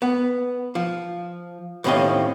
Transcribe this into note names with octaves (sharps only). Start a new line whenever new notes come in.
B3
F3
D#2 A2 D#3 C4 C#4 D#5